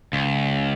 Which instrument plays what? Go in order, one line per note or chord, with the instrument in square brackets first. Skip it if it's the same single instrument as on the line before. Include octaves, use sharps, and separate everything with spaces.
[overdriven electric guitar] C#2